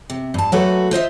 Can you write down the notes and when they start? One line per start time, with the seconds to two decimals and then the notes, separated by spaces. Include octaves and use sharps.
0.10 C3
0.34 G2 A5
0.52 F#3 A3 A#3 F#4 A4 B4
0.91 F4 C5 D#5 E5